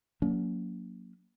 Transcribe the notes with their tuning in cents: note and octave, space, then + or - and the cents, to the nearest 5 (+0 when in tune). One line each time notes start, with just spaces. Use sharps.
F#3 -20 A#3 +0 C#4 +45